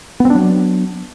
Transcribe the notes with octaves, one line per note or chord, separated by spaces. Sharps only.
F#3 B3 C4 D4